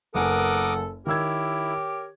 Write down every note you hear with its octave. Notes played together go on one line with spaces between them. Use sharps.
F#1 B3 A4 A#4 F#5 G#5 D6 D#6
D#3 E4 G4 A#4 C#5 E6 G#6